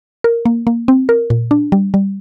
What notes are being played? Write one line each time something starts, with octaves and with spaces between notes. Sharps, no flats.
A#4
A#3
A#3
C4
A#4
A#2
D4
G3
G3